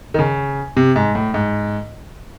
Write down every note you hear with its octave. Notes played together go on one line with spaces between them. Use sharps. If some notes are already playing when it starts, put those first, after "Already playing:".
D#3
C#3
C3
G#2
A2
G#2